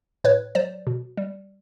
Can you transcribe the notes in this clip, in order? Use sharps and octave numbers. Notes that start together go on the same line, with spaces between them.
A2 B4 C#5
F#3 C5 D5
B2
G3